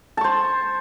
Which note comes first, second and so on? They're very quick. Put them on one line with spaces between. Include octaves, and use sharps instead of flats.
A5 C#6 C5